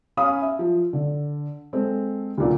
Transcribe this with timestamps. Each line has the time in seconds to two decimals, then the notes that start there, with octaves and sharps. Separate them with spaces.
0.17 C#4 F5 B5 D#6
0.42 E5
0.59 F3
0.93 D3
1.73 G#3 C4 A4
2.38 D2 A#2 D3